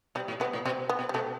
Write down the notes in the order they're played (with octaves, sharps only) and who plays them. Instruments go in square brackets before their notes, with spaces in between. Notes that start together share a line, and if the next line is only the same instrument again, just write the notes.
[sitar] B2 [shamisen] G3
[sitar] A2
[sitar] B2 [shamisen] B3
[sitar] A2
[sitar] B2 [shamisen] C4
[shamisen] B3
[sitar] B2
[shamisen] G3
[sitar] B2 [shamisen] A3